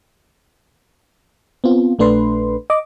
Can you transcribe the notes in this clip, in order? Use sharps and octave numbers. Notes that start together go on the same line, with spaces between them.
B3 C4 F4
A#1 A3 D4 B4 C6
D#5 D6